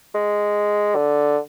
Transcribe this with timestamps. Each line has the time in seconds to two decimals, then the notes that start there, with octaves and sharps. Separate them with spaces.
0.15 G#3
0.95 D3